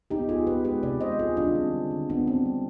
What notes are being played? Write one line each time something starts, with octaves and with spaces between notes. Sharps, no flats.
B3 D#4 G4
B3 F4 G#4
B3 G4 B4
G#3 G4 B4
C3 B4 D5
G#3 C5 D#5
G#3 F4 G#4
D#3 D4 F4
G3 C4
D3
D3
B3 D4
B3 C4
G3